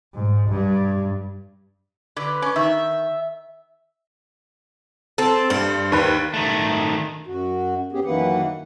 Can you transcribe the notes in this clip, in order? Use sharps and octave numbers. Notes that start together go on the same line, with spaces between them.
G#2
G2
D3 B4 D5
C#4
D#3 E5
C4 A4
G2 C5
D#2 B4
D#3 A3
F#2 F#4
B3 C#4 G4 G#4
F#2 D#3 E3 A#3 B4 F#5